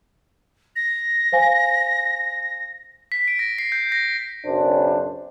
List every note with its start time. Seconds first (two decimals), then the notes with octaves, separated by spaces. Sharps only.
0.76 A#6
1.32 C5 F5 G#5
3.12 B6
3.28 D7
3.39 A#6
3.58 C7
3.72 G6
3.92 A#6
4.46 B1 F#2 C#3 D4 C5